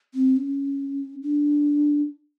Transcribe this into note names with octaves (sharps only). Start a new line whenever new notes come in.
C4
C#4
D4